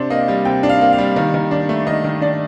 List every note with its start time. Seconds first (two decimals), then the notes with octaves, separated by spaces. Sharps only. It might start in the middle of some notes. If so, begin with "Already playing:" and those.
Already playing: C3 D4 C5
0.10 A#3 D#5
0.28 G3
0.45 C3 G5
0.63 D4
0.69 F5
0.81 A#3
0.93 F5
0.98 G3
1.16 D#3
1.34 D#3
1.51 D4
1.69 A3
1.87 D#3 D#5
2.04 D#3
2.21 D4 D5